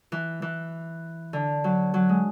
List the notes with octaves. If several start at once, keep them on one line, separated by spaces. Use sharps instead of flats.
E3
E3
D3
F#3
F#3
G#3